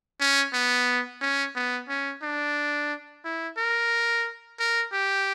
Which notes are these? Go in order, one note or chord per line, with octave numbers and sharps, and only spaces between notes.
C#4
B3
C#4
B3
C#4
D4
E4
A#4
A#4
G4